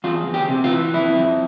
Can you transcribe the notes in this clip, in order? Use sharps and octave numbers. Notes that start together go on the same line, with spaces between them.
E2 F4
E2
G4
C3
F4
E3
F2 E4
F2